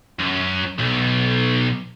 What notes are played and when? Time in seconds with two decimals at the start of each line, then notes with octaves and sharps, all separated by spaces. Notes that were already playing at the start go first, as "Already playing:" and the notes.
0.19 F#2
0.79 B1